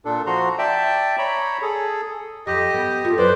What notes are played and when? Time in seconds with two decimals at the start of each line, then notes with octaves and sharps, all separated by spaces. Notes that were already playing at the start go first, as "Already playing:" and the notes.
0.05 A#2 D4 A4
0.26 F3 F#4 A#5 C6
0.59 D5 E5 G5 A5
1.18 C#5 A#5 B5
1.62 G#4 A4
2.47 F2 G4 D#5
2.74 B3
3.05 A3 F4
3.18 F#2 B4 C5 D5